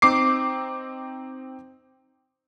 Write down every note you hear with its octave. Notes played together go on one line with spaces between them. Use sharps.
C4 D#4 D6 C7